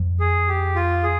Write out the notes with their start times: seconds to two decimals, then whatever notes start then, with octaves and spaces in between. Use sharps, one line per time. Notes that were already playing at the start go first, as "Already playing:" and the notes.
Already playing: F2
0.20 G#4
0.48 G4
0.76 F4
1.03 G#4